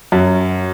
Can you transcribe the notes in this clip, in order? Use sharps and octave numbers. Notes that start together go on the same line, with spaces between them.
F#2 F#3